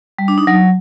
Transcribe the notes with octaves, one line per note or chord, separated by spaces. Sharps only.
G3
D4
D#4
F#3